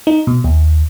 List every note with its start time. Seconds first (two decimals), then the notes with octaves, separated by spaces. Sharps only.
0.07 D#4
0.27 B2
0.44 D#2